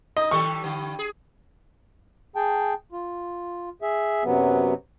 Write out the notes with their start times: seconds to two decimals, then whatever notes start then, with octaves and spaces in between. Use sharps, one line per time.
0.17 D#4 D#5
0.31 D#3 G3 A4 C#6
0.63 G2 D3
0.99 G#4
2.36 G#4 G5 A5
2.92 F4
3.82 G#4 E5
4.24 F#2 C3 F#3 B3